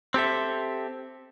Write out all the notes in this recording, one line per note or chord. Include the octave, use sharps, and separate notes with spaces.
C4 G4 A4 E5